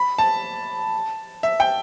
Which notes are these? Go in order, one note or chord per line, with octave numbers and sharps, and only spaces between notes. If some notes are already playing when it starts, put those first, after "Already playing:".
Already playing: B5
A5
E5
G5